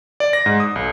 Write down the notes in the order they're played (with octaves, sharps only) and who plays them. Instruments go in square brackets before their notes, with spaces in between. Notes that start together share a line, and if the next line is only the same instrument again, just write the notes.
[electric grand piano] D5
A#6
G#2
D#6
B1